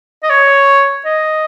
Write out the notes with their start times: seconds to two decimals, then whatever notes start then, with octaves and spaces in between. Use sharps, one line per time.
0.23 D#5
0.30 C#5
1.05 D#5